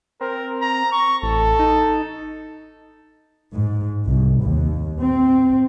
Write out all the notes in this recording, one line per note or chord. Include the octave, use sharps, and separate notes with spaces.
C4 A#4
A#5
C#6
A1 A4
D#4
G#2
C2
D#2
C4